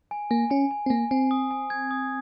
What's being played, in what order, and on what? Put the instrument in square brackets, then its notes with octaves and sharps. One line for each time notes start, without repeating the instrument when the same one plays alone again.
[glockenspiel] G#5
[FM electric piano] A#3 [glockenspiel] G#5
[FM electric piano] C#4 [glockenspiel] G#5
[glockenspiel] G#5
[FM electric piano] C4
[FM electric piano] A#3 [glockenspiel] G#5
[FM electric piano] C4 [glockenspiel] G#5
[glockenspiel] D#6
G#5
G#6
D#6